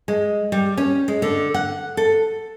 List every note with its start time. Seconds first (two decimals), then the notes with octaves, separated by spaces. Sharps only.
0.08 G#3
0.52 G3
0.77 C#4
1.08 G#3
1.22 D3
1.54 F#5
1.97 A4